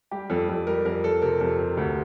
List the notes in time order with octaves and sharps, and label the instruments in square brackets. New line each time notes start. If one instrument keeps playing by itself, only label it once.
[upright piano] G3 [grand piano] G4
[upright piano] F2 [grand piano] A4
[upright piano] F2 [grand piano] A4
[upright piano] G3 [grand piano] A#4
[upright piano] F2 [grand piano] A#4
[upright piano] F2 [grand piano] A4
[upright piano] C3 [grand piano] A#4
[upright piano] F2 [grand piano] A4
[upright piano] C3
D2